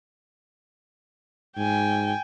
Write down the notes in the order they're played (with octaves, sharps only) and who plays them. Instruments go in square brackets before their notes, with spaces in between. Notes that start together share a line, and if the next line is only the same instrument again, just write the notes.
[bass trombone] G#2 [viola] G5 G#5